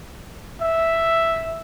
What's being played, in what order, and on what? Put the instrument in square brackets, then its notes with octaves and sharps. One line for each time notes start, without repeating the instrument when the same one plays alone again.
[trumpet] E5